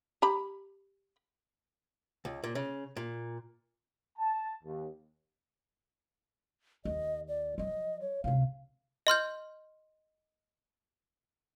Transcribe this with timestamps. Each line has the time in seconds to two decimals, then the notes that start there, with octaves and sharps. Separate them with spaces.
0.22 G4 A#5 B5
2.25 C#2
2.44 A#2
2.55 C#3
2.97 A#2
4.18 A5
4.64 D#2
6.85 D#2 D#5
7.29 D5
7.58 F3 F#3 D#5
8.01 C#5
8.24 C#2 C3 F5
9.07 D#5 C6 F6 G6